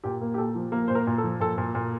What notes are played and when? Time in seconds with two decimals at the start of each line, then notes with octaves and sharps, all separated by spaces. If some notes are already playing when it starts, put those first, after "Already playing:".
0.04 A#2 G4
0.21 A#3
0.34 G4
0.38 A#2 A4
0.55 F3
0.72 A#3 A#4
0.88 A#2 C5
0.95 A#4
1.07 A#2
1.18 A4
1.24 F3
1.40 A#2 A4
1.58 A#2
1.75 A#2